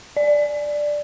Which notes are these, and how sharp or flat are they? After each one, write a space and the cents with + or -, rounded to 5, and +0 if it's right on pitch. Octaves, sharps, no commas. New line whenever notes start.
D5 +5